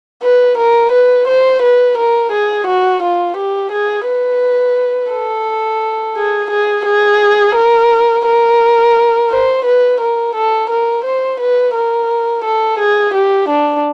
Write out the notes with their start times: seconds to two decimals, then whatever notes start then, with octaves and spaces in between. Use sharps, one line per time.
0.23 B4
0.58 A#4
0.92 B4
1.28 C5
1.62 B4
1.98 A#4
2.32 G#4
2.67 F#4
3.03 F4
3.37 G4
3.72 G#4
4.07 B4
5.12 A4
6.16 G#4
6.51 G#4
6.85 G#4
7.56 A#4
8.26 A#4
9.30 C5
9.65 B4
10.01 A#4
10.35 A4
10.70 A#4
11.05 C5
11.40 B4
11.74 A#4
12.45 A4
12.79 G#4
13.14 G4
13.49 D4